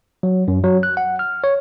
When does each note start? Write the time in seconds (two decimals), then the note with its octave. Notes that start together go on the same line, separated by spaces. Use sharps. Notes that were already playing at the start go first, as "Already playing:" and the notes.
0.23 F#3
0.48 F#2
0.64 F#3
0.83 F#6
0.97 F#5
1.19 F6
1.44 C#5